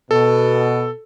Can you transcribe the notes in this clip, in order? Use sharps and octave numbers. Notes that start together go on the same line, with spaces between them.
B2 A4